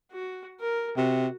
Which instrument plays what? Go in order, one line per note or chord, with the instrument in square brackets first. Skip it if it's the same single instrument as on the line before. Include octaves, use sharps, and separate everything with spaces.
[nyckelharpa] F#4
A#4
[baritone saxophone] C3 [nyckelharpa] F#4